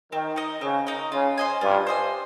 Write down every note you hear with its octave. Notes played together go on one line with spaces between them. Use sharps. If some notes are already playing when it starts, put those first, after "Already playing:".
D#3 C4
D#4 A#4 D#5
C#3 C4
D#4 A#4 D#5
C#3 F4
C5 D#5 G#5
G2 F4
C5 D#5 G#5